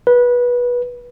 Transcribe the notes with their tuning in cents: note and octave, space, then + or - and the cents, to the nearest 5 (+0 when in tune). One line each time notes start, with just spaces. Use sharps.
B4 -20